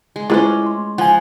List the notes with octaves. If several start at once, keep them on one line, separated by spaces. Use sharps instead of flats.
G#3
G#3 A3 C#4 E4 F4 B4 C5 D6
C6
F3 F#5 G#5